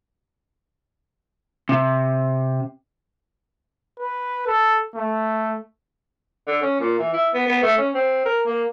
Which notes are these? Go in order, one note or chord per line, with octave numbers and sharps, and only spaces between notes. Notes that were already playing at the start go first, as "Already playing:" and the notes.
C3
B4
A4
A3
D3
C#4
A#2
E3
E4
B3
B3
A3
C#4
C4
A#4
A#3